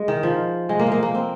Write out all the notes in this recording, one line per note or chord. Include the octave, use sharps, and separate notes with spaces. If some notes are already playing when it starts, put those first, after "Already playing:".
Already playing: G#3
D#3
F3
G#3
A#3
G#3
A#3
A#3
C4